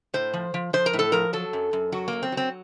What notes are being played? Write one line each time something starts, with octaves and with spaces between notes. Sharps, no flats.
A2 C5
F3
F3
F3 C5
A#4
A2
A4
F3 A#4
F#3 A4
F#2
F#2
F#3 F#4
F#2 A#3
C4
F#3
C4